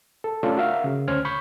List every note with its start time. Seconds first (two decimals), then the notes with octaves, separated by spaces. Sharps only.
0.24 A4
0.43 A3 C#4 D4 F4 A4
0.57 F#4 A#4 E5 F5
0.84 C#3
1.08 D2 C#4 C5 F6 G#6
1.25 B5 C#6 G6